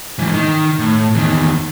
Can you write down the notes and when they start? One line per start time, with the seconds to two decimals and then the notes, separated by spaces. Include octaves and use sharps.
0.18 G#2 E3
0.34 D#3
0.79 A2
1.15 E2 D#3